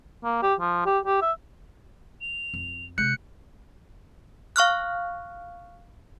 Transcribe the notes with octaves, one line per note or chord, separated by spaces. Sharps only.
A#3
G4
F3
G4
G4
E5
F7
F2
C3 G#3 F#6 G6 C#7
F5 C#6 F6 F#6